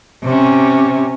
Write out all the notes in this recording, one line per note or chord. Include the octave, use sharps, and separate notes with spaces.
C3 C#4